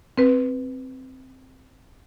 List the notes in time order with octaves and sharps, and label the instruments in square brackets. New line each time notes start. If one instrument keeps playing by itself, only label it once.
[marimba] C4 B4